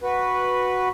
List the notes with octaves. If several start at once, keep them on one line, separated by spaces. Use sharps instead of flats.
F#4 B4